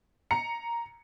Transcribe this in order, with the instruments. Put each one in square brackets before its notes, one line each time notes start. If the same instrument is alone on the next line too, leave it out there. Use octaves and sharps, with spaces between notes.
[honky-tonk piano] A#5 C#7